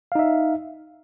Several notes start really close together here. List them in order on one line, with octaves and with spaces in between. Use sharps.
F5 D#4 E5